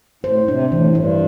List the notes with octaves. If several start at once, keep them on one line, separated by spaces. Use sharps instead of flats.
A2 C5
C3 D4
A2 E3
G2 E4